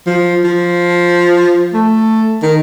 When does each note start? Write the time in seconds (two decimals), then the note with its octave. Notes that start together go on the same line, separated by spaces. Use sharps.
0.07 F3
0.44 F3
1.74 A3
2.43 D#3